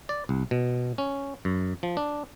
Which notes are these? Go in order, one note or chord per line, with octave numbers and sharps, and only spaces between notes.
D5
C2
B2
C#4
F#2
F3
D4